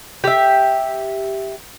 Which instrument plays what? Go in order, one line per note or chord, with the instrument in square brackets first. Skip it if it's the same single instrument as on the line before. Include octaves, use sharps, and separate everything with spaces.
[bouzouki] G4 E5